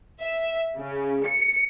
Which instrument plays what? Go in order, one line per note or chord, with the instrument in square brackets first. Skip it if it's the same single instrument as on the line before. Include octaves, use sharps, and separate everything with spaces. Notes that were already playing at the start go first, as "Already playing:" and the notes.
[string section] E5
C#3
C#7